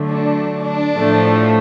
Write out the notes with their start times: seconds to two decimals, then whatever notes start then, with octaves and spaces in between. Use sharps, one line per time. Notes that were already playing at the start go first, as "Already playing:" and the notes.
Already playing: D3 F#3 A3
0.09 D4
0.66 D4
0.95 A2 F3 A3